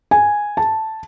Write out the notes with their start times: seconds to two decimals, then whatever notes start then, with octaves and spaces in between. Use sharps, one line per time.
0.11 G#5
0.57 A5